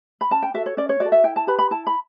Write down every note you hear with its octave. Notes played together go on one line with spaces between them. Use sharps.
B5
C#4 A5
G5
F#4 A4 E5
C#5
C#4 D5
C#5
F#4 A4 D5
E5
E4 G5
A5
G4 B4 B5
B5
E4 A5
B5